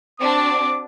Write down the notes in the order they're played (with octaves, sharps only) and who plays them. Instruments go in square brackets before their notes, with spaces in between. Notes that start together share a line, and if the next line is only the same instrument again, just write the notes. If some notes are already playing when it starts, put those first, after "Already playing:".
[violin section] C4 D4 F#4 [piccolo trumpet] D6